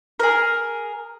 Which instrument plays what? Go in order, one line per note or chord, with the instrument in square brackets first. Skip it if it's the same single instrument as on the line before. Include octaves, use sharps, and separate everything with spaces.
[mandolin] G#4 A#4